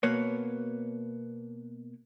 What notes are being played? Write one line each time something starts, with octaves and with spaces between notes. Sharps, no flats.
B2 A#3 B4 C#5